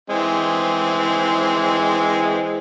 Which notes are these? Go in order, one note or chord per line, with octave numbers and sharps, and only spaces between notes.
E3 G#3 C4